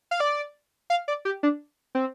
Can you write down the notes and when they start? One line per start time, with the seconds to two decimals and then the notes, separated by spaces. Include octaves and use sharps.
0.11 F5
0.20 D5
0.90 F5
1.08 D5
1.25 G4
1.43 D4
1.95 C4